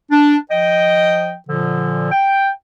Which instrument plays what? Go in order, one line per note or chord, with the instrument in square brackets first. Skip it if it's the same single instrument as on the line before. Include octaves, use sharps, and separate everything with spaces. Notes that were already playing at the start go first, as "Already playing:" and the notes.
[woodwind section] D4
F3 D#5 G5
A#2 D3 F3
G5